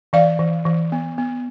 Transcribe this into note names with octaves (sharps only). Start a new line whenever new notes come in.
E3 D5 F5
E3
E3
B3
B3